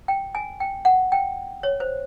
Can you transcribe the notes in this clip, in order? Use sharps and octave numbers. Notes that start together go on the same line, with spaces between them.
G5
G#5
G5
F#5
G5
C#5
C5